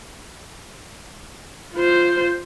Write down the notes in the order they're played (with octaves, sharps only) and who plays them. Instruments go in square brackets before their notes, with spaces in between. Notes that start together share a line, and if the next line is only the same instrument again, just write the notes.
[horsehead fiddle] F4 C5